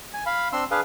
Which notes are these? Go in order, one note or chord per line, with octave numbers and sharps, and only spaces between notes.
G#5
F5 B5
C4 D4 C6 E6
D4 G#4 B4 F5